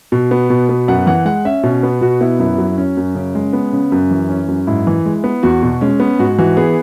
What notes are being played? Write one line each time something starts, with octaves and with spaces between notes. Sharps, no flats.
B2
B3
B2
B3
F#2 F#5
E3 F#5
G#3 F#5
C#4 E5
B2 C#4
B3
B2 F#4
B3 E4
F#2 E4
F#3
C#4
F#2
C#3
G#3
B3
C#3
F#2
E3
C#4
F#2
G#2 E4
E3
G#3
B3
E2 F#4
B2
G#3 C#4
B3
G#2 F#4
E3 F#4
B3 G#4